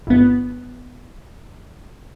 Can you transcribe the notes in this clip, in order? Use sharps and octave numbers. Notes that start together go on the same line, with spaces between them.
G1 B3